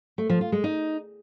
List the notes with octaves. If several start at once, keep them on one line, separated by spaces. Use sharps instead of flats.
A3
F3
F4
G#3
D#4